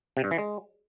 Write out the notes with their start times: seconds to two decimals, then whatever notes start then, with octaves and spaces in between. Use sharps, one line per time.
0.17 C3
0.24 G2
0.31 E3
0.38 G#3